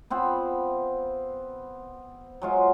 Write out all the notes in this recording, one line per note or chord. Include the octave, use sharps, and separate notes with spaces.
B3 C4 F4 B5
F#3 G#3 F4